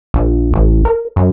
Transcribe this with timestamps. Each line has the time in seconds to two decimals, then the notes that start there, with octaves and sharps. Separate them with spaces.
0.14 A#1
0.53 A1
0.85 A#4
1.16 F#2